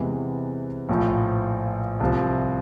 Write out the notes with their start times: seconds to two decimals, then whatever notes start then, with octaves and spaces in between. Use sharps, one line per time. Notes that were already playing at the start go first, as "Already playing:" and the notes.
Already playing: E2 C3 E3 G#3
0.89 A#1 A2 F3
2.00 C2 C3 F3